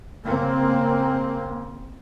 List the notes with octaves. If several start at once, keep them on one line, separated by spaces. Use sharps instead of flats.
C#3 A#3 C4